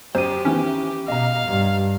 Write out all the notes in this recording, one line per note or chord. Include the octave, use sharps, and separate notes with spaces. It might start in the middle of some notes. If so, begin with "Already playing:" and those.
F#2 G4 C5 D#7
D#3 E3 B3 C#4
B2 D#5 F5 A#5
G2